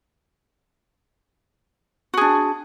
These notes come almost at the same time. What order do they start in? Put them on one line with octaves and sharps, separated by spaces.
F#4 G#4 D4